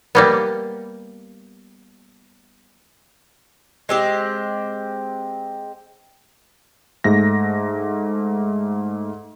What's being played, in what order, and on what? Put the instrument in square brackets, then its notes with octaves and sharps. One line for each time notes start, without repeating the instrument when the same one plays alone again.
[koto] G3 A#3 B3
[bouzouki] G#3 C4 G4
[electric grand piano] G#2 A3 A#6